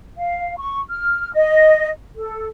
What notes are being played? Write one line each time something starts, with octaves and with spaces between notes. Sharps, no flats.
F5
C#6
F6
D#5
A4